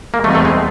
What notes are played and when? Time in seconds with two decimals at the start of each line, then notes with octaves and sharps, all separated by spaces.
0.14 A#3
0.24 E2 B2 G3 A3 C4 D#4
0.35 A3
0.45 G#3